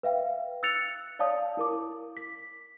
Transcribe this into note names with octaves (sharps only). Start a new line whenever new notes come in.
B4 E5 F5 G5
E6 F#6 A6 C#7 F7
C#5 D5 F5 A5 D#6
E4 A#4 D6
B6